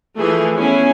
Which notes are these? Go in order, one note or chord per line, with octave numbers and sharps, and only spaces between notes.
E3 F3 A3 G#4 A4
B3 C#4 E4 G#4 G#5